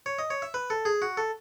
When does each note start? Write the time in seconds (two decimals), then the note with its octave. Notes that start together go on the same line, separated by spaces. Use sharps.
0.06 C#5
0.19 D#5
0.30 C#5
0.42 E5
0.54 B4
0.70 A4
0.85 G#4
1.02 F#4
1.17 A4